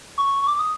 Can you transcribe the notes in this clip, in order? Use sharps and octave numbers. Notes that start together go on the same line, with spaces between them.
C#6
C#6
D6
D#6